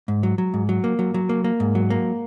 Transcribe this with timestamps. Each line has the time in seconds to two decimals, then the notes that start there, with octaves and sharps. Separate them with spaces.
0.08 G#2
0.23 F#3
0.38 F#3
0.54 G#2
0.69 F#3
0.84 A#3
0.99 F#3
1.14 F#3
1.29 A#3
1.44 A#3
1.60 G#2
1.75 F#3
1.90 A#3